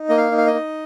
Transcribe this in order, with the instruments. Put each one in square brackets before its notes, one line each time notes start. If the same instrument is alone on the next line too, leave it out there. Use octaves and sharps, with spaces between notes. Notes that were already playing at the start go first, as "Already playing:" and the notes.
Already playing: [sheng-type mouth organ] D#4
A#3 D#5
F5
D#4
F5
D#5
D#4